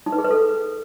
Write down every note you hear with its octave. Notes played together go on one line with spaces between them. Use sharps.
D#4
B4
G#4
B4
A4